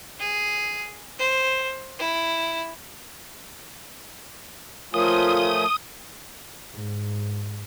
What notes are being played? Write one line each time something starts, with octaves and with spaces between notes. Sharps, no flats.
G#4
C5
E4
F3 A3 F4 A#4 C#5 G#5 D#6
G#2